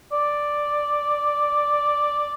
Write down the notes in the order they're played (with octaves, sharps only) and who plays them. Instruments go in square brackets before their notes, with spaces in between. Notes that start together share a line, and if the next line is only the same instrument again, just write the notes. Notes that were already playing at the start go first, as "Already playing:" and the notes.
[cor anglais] D5